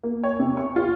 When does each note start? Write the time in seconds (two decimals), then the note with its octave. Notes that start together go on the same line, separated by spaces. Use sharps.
0.03 A#3
0.24 C#5
0.39 C3
0.57 C#6
0.76 F4